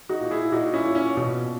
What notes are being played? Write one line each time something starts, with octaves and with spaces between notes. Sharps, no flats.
D#4 F#4
A#2
E4 G#4
A#2 D#4 F#4
C#4 E4
A#2
C#4
B2